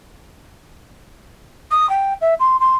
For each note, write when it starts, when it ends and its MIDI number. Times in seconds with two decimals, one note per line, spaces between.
1.71 1.89 87
1.90 2.14 79
2.21 2.34 76
2.40 2.57 84
2.60 2.76 84